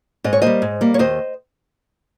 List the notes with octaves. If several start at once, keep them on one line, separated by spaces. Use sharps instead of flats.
G#2 D#5
C#5
G3 A#3 C5 D#5
G#2
G3 A#3
C#5
D#2 C5 D#5